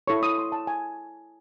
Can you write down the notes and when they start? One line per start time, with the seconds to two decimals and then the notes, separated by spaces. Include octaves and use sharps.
0.08 E4 A4 C#5 C#6
0.23 D#6
0.38 C6
0.52 A5
0.67 G#5